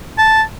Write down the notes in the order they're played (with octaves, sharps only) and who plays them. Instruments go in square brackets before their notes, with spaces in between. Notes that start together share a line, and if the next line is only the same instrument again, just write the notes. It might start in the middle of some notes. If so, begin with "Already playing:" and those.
[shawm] A5